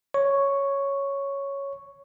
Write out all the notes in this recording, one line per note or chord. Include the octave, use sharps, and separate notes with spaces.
C#5 C#6